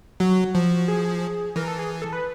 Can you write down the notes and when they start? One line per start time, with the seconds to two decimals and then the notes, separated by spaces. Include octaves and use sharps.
0.20 F#3 F#4
0.55 F3
0.88 G#4
1.56 E3 A#4
1.67 A4
1.79 G#4
2.02 A4
2.13 B4